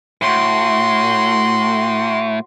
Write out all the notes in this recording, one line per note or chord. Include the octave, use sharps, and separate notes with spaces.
A2 F#4 C6